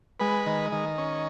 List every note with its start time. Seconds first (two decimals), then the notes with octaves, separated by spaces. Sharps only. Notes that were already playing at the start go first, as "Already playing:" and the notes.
0.20 G#3 B4
0.46 D#3
0.72 D#3
0.98 C#4